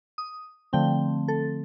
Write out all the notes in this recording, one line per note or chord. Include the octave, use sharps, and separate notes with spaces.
D#6
D3 F3 A3 C4 G5
A4